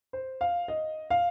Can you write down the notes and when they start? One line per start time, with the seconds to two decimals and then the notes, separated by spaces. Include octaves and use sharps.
0.13 C5
0.41 F5
0.68 D#5
1.10 F5